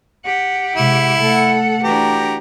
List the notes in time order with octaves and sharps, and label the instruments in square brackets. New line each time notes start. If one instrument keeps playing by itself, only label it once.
[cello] G4 F#5
[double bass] C3 G#3 [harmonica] E4
[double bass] A3 [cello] A4 F#5
[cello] E3 D4 [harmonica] F#4 G4 A#5